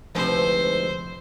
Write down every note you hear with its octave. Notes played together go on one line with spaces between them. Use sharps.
D2 C3 F3 G#3 D#4 E4 B4 C5